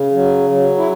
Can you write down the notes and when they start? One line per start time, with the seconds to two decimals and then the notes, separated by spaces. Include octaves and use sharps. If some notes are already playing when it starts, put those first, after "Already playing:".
Already playing: C#3
0.13 F#3
0.50 F#3
0.78 E4